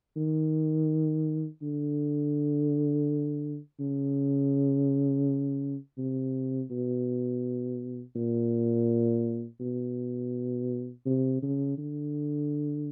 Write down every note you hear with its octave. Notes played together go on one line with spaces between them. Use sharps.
D#3
D3
C#3
C3
B2
A#2
B2
C3
C#3
D3